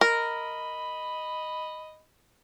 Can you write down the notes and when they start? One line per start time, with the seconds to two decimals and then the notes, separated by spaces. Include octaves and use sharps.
0.01 A#4 D#5 B5